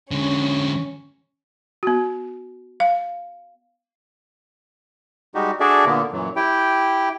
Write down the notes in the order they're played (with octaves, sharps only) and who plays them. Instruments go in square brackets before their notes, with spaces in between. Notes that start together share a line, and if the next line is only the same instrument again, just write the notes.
[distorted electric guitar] D3 G#3 [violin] C#4
[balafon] B3 F#4
F5
[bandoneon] G3 G#3 D#4 F#4 G4
D4 F#4 G#4 A4 D5 E5
A#2 D3 A#3 B3
F#2 A#2 E3 F#3
E4 G4 G5